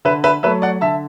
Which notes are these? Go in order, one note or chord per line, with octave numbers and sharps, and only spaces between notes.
D3 B4 E5
B4 E5
F#3 A3 B4 E5
D5 F#5
D3 E5 A5